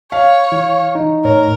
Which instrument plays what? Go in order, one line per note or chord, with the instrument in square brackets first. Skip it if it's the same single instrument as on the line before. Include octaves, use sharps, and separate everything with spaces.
[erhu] C#5 [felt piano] F5
[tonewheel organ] E3
[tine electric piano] D#4
[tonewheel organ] A2 [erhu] A#4 [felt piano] C#5